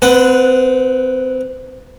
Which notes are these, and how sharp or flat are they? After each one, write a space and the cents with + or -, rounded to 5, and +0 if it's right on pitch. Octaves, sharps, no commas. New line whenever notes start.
C4 -25 B4 +0 F#5 -10